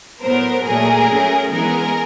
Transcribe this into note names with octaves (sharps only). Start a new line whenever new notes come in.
A2 F#3 B3 A#4 C5
A#2 F#3 A3 G#4 A#4
F#3 A3 C#4
E3 G#3 B3 G#4 A#4